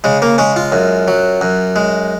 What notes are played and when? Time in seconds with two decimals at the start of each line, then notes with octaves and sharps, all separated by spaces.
0.04 C#3 G#3
0.22 A#3
0.38 G#3 C#4
0.56 F4
0.72 F#2
1.08 F#3
1.41 F#2
1.76 G#3